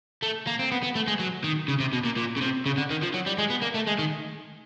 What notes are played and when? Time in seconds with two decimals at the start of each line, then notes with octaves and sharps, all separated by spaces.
0.22 A3
0.47 A#3
0.59 C4
0.72 B3
0.83 B3
0.95 A3
1.08 G#3
1.19 F#3
1.44 D#3
1.68 C#3
1.80 C3
1.93 B2
2.05 A#2
2.17 A#2
2.37 C#3
2.42 C3
2.66 C#3
2.77 D3
2.90 D#3
3.02 F3
3.14 F#3
3.26 G3
3.38 G#3
3.50 B3
3.62 A#3
3.75 A3
3.87 G#3
3.99 D#3